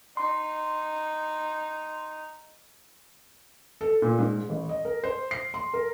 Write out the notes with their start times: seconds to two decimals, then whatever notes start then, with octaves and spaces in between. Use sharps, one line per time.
0.17 D#4 C6
3.81 A4
4.02 A#2
4.19 G#2
4.49 A1
4.69 D#5
4.85 A#4
5.04 C5
5.31 C7
5.54 C6
5.74 A#4